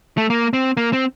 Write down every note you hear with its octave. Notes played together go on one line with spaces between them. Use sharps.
A3
A#3
C4
A#3
C4